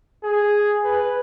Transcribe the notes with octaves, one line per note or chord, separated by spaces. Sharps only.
G#4
B4